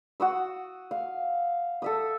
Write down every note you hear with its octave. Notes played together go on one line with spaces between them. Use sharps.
F#4 D#6 E6
F5
A4 E5 D#6